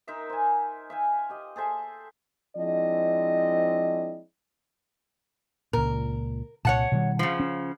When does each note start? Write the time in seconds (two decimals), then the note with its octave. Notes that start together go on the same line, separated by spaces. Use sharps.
0.07 D#4 A#4 E5 C6
0.30 C5 G#5
0.90 E5 F5 G#5
1.30 G4 D#5
1.56 G#4 A4 C5 E5
2.56 F3 G#3 C4 D4 E4 D#5
5.73 C#2 A#2 A#4
6.65 C2 A#2 C#5 F#5 A5
6.92 B2 D#3 G3
7.19 C#3 F3
7.40 C#4